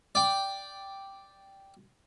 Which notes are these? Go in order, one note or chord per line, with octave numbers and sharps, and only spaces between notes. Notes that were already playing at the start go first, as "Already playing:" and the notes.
D5 G5